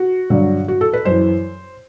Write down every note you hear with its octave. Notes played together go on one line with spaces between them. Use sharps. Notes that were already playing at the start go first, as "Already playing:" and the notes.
Already playing: F#4
G2 D3 F#3
F#4
A4
B4
F#2 E3 C5